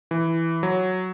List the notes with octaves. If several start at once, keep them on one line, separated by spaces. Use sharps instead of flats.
E3
F#3